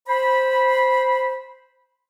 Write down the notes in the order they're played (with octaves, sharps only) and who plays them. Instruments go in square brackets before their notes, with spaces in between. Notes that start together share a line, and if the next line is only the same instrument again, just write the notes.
[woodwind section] C5 B5